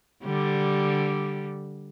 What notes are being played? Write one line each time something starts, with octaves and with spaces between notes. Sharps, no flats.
D3 G3